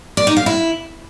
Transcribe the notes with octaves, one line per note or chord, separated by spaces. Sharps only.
D5
D#4
F5
E4